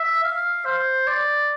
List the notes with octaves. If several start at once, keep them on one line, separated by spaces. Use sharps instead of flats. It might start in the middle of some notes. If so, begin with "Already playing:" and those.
Already playing: E5
F5
C5
D5